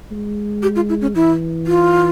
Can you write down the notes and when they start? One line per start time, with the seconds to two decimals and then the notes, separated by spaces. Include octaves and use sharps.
0.11 G#3
0.63 G4
0.76 F4
0.89 E4
1.01 C#4
1.15 E3 E4
1.67 F4